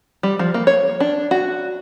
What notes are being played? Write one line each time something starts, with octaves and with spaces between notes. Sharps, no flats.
G3
F3
A#3
C#5
D4
F#4